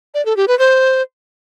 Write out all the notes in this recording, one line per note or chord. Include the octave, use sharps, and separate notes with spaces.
D5
A4
G4
B4
C5